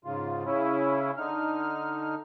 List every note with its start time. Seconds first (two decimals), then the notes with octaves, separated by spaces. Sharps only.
0.05 G#2 C#3 F4
0.45 C#3 C#4 E4
1.18 D3 D#4 F6